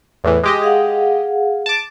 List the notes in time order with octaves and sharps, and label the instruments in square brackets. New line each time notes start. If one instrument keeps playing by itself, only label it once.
[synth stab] E2 A2 E3
G#3 G4 D#5
[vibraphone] G#4 F5 F#5
[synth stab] A5 D6